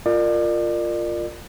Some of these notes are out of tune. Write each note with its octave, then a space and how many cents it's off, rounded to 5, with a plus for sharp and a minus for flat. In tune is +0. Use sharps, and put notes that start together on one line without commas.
F4 +0 A#4 -15 D5 +35